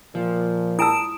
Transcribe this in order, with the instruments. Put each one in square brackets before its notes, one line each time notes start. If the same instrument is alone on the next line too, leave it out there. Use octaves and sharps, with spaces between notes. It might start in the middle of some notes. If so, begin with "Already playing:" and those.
[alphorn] A#2 [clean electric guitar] F3
[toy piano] E4 A5 E6 [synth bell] D#6 D7 E7